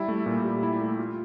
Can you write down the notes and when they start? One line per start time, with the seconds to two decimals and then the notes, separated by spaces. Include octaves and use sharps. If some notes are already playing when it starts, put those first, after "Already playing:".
Already playing: G3 E4
0.08 A3
0.26 A#2
0.44 G4
0.63 E4
0.81 A3
0.99 F4